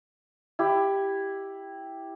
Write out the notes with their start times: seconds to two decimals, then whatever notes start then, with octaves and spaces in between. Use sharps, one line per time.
0.59 E4 G4